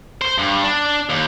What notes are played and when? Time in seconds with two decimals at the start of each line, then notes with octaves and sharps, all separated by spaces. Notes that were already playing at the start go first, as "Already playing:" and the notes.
0.21 C5
0.38 G2
0.64 D4
1.09 D#2